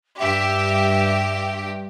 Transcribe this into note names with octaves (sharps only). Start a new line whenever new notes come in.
G2 G4 E5